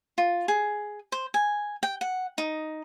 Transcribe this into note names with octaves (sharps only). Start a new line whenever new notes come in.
F4
G#4
C5
G#5
G5
F#5
D#4